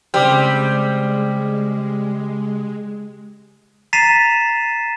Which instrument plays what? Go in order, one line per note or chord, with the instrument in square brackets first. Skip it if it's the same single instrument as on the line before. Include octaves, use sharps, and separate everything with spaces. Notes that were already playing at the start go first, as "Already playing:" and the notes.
[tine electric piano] C#3 G4 F6 [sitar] G3 [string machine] G#3 [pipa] C4
[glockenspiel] A#5 A6 B6 C7 D#7 E7